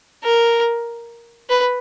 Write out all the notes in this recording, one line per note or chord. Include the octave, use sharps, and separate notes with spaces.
A#4
B4